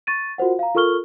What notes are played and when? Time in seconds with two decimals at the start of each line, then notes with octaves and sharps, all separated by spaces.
0.07 C#6 A6 D#7
0.38 F4 F#4 A#4 C5 F#5
0.59 F5 A#5
0.75 F4 A4 A#4 C#6 F6 G7